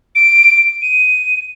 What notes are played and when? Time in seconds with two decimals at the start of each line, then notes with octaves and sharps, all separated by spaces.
0.15 D7
0.82 D#7